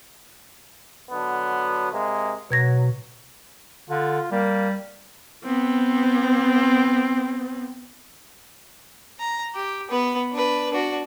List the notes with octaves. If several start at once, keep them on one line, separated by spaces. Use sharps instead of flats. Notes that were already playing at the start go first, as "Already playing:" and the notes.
D3 F#3 B3
C3 G#3 A#3
B2 F#3 G#6 A#6
D3 F4
G3 A#3
B3 C4
A#5
G4
B3 B4
D4 B4
D4 F#4